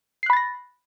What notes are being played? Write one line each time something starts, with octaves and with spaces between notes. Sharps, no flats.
B5 F#6 A6 A#6 C7